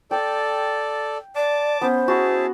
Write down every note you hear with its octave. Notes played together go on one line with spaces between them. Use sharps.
A4 D5 G5
D5 A5 D6
B3 C#4 C5
E4 F#4 G#4 A5